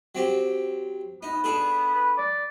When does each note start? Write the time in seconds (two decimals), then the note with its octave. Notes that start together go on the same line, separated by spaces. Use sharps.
0.15 F#3 C4 G4
1.23 B3 D#4
1.44 D4 G#4 A4
1.94 B4
2.18 D5